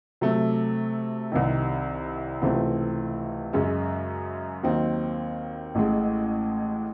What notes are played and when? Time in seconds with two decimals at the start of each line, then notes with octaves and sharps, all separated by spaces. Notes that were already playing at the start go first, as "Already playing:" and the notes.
0.21 C3 F#3 A3
1.32 C2 C3 D#3
2.42 C#2 C3 E3 A3 C4
3.53 F#2 C#3 G#3 C#4
4.63 D#2 D#3 F#3 C4
5.75 A1 A2 G#3